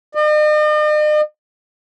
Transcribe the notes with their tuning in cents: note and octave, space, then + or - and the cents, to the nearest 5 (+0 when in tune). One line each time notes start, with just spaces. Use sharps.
D#5 -45